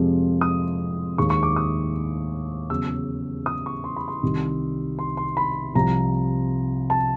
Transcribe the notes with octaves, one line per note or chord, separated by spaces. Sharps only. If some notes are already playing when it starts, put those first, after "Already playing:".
Already playing: F2 C3 F3 G#3
D#6
D#2 D#3 G#3 C#6
C#6
D6
D#6
E2 C#3 F#3 E6
D#6
C#6
C6
B5
C6
C2 C3 D#3 G3
C6
C6
B5
C2 C3 F3 A#5
A5